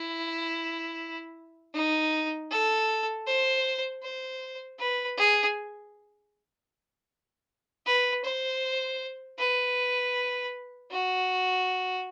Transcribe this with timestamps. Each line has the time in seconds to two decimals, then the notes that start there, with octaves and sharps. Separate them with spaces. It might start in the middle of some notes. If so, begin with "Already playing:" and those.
Already playing: E4
1.74 D#4
2.51 A4
3.27 C5
4.03 C5
4.79 B4
5.17 G#4
7.86 B4
8.24 C5
9.38 B4
10.91 F#4